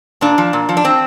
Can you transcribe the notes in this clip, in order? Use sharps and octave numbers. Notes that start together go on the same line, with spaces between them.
A#2 D4
F3
A#2
F3
D4
C4